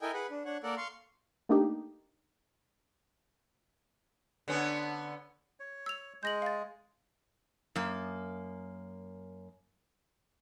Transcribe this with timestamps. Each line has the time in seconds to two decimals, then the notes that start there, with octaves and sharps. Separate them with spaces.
0.01 E4 A4 A#4 D#5 G5 G#5
0.14 G#4 B4 F#5
0.30 D4
0.45 D4 C#5 F#5
0.63 A#3 A4 A#4 D5 F#5
0.77 F5 C6 C#6
1.49 A3 A#3 D4 D#4 G4
4.48 D3 B3 C#4
5.60 C#5
5.86 E6 F7
6.23 G#3 G6 A#6 F#7
6.42 F5 A6
7.76 F#2 A#3